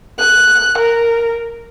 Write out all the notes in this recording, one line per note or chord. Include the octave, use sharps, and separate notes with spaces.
F#6
A#4